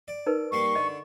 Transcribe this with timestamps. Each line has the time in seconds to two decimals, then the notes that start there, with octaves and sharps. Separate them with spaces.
0.08 D5
0.26 D#4 A#4 B4
0.52 G3 A#3 C6 C#6
0.75 D3 D#5